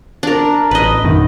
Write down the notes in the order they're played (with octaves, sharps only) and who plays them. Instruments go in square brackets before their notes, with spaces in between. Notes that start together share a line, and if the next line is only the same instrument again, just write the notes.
[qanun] D4 A#4
[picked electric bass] A1 [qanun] B4 D#5
[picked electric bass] F#2 B2 D#3